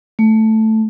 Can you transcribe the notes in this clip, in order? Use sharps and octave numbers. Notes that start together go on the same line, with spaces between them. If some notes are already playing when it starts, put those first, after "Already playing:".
A3